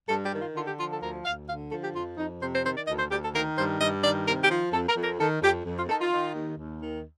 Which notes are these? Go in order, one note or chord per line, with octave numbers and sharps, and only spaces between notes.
G2 A4
G4
D#3
F4
D3 F4
G4
F3 F4
A4
D2 A#4
D2 F5
D3 F5
F3 A4
G4
F2 F4
F2 D#4
C3 C5
C5
D#3 C5
D5
D2 D#5
C5
D2 G4
A4
D#3 A#4
G2 C5
G2 D#5
D#3 D5
C3 A#4
G4
F3
F2 A4
A#4
F2
A#4
D#3 A4
F2 G4
F2
F4
D#3 A4
F4
D#3
D#2
D#2
D#3